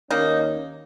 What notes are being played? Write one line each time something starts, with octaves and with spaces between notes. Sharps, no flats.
D#2 D#3 A#3 C#4 D#4